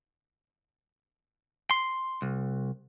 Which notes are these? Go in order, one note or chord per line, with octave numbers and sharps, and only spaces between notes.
C6
C2